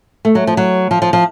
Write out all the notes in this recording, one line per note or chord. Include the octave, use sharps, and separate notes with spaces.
A3
F#3
F3
F#3
F3
F3
F3